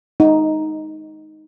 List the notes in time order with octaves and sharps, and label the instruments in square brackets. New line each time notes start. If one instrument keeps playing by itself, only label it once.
[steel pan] D#4